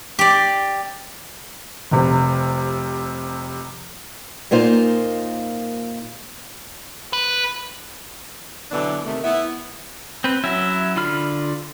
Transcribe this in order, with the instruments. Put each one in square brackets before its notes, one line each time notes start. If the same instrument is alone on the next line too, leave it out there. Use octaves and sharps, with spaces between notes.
[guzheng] G4 D5
[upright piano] F1 C3
[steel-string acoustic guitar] A#2 A#3 D#4 F4 C5
[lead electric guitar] B4
[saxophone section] B2 D3 E3 F#3 D4
C3 D#3 A3
B3 E4
[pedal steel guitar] C4 B4
F#3 C#4 E4 E5
D3 F4 B5 F6